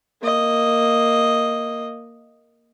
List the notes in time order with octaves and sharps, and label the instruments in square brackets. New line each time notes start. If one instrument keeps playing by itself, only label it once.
[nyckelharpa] A#3 D#5